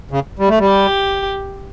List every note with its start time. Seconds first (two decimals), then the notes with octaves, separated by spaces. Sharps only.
0.11 C#3
0.39 G3
0.49 A3
0.59 G3
0.68 G4